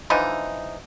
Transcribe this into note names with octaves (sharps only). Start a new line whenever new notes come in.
D3 E3 F3 D#4